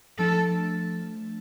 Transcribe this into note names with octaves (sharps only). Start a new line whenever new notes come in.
F3 A3 D4 A4